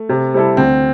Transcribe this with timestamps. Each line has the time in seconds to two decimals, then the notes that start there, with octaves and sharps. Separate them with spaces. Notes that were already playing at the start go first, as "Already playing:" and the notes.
Already playing: A3
0.09 C3
0.34 G3 C4 E4 A4
0.57 D2 C4